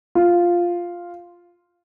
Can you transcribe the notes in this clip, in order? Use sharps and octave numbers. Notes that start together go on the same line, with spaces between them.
F4